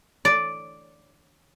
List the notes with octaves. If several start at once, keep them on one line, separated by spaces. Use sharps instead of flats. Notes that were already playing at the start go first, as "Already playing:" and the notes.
D5